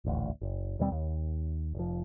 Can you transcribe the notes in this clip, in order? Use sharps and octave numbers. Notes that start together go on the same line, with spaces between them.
D#1 A1 D2
F#1
D#2 B2 G3 C4
D#2
F1 F3